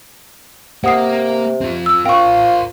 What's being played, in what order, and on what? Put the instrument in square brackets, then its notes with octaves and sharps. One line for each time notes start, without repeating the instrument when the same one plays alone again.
[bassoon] C3 [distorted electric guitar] A#3 [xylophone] F#5 D#6 C7
[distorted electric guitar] C4 F4
[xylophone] E6
[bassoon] F4 [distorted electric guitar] A#4 C5 [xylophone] G5 C#6